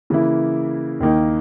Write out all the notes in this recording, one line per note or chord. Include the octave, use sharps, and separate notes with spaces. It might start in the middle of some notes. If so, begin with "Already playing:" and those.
C#3 E3 A#3 E4
D#2 D#3 A#3 D#4